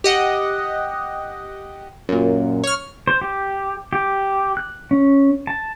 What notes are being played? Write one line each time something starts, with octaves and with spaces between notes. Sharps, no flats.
G4 D#5 F#5
F#2 A#2
C#5 F6
C5
G4
G4
F#6
C#4
A5